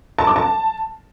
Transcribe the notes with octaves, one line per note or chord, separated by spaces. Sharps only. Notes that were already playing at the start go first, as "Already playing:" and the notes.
A5
D6
A5